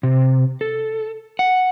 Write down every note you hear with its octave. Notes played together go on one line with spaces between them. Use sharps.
C3
A4
F#5